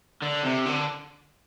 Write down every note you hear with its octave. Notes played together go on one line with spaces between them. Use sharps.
D3
C3
D3